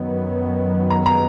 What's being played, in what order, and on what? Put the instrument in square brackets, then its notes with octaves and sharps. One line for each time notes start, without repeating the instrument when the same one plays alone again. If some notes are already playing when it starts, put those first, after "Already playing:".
Already playing: [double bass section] F#2 D#3 F#3 B3
[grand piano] A#5
A#5